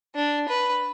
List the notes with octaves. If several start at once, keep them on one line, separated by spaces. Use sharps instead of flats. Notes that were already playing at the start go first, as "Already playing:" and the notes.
D4
B4